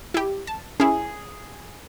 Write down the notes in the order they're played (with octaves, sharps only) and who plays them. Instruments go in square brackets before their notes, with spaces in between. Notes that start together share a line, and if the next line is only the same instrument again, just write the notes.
[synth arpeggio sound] E4 G4
A5
[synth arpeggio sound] C#4 E4 [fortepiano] G#4